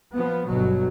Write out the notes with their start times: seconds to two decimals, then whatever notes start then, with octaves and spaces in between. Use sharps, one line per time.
0.15 F3 B3
0.47 G1 B2 F#3